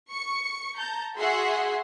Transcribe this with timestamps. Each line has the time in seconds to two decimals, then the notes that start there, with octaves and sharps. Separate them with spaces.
0.11 C#6 C#7
0.79 A5 A#5 G6
1.18 F#4 G#4 E5 F#5 C6